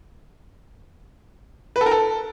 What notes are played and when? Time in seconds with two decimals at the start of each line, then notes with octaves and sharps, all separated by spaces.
1.76 B4
1.81 A4
1.86 A#4
1.91 A4